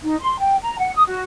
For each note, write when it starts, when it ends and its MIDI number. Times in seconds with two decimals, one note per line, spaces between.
0.04 0.17 63
0.20 0.38 84
0.38 0.55 79
0.61 0.76 82
0.78 0.93 78
0.94 1.03 87
1.06 1.23 66